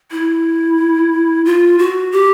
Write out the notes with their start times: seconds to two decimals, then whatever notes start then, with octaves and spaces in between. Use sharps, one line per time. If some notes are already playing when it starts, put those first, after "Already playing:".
0.11 E4
1.45 F4
1.79 F#4
2.12 G4